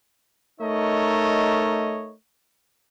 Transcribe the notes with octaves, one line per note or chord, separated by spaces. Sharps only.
A3 D#4 A#4 C#5 D#5